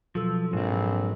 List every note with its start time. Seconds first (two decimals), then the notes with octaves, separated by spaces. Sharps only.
0.15 B2 F3 F#3 A4 E6
0.53 A#1 G#2 C4